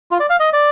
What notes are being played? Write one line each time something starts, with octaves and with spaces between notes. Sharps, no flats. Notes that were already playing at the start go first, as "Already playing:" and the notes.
F4
D5
F5
D#5
D5